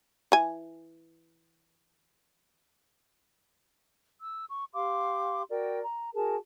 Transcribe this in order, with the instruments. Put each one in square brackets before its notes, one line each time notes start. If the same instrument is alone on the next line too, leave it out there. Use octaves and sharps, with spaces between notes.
[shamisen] E3 G#5
[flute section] E6
C#6
G4 F5 C6 D6
F#4 A#4 D5 G5
A#5
F#4 G#4 A#4 A5